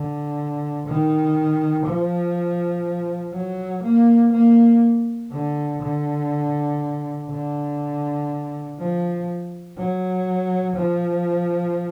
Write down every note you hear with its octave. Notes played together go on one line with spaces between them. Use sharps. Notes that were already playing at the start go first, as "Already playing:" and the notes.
Already playing: D3
D#3
F3
F#3
A#3
A#3
D3
D3
D3
F3
F#3
F3